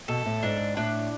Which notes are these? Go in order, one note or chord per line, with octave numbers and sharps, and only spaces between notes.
B2 A4
A2
G#2 D4
A2 D4